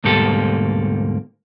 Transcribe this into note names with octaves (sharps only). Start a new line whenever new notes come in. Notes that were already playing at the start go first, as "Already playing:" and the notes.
D2 G#2 B2 G3 A#3 A4